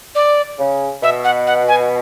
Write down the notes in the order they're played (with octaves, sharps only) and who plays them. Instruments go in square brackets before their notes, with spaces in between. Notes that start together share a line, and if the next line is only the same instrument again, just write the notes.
[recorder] D5
[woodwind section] C#3
[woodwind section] B2 [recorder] E5
[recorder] F#5
F#5
G#5